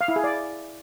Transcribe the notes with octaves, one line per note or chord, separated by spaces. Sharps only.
F5
E4
G#4
D5